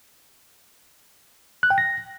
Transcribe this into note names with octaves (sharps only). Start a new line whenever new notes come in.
F#6
G5
A#6